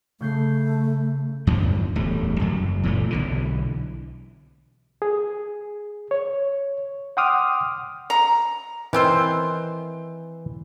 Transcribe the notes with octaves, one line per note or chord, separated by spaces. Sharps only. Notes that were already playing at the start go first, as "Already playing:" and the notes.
C#3 A3 G6 C7
E2 G2 D3 F3
D1 E2 G3 A3
F#1 F#2 F#3
A#2 E3 G#3 A3
B1 D3 E3
G#4
C#5
F#5 G5 C6 D6 D#6 F6
A#5
D#3 E3 C4 C5